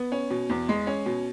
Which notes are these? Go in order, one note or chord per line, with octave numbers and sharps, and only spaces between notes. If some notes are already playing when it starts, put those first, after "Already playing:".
Already playing: B3
C#4
B2
E2
G#3
C#4
B2